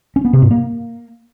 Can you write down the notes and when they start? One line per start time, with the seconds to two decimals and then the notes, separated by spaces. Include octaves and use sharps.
0.16 C#4
0.25 B3
0.33 C3
0.42 G#2
0.51 A#3